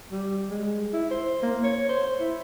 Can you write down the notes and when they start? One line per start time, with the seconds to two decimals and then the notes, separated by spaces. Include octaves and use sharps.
0.11 G3
0.50 G#3
0.93 E4
1.10 C5
1.42 A#3
1.64 C#5
1.89 C5
2.20 E4